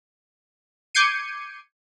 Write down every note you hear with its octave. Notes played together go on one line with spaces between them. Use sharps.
D6 G6 G#6 C7 C#7 D#7